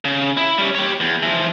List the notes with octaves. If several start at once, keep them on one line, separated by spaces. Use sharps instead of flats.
C#3
E4
G3 C#4
G4 C#5
E2
E3 F3